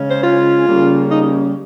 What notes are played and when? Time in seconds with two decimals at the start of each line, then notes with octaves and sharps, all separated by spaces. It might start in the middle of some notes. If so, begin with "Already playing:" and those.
Already playing: C#3 G#3 C#4
0.09 C5
0.23 F4
0.66 C#3 G3 A#3 C#4
1.10 D#4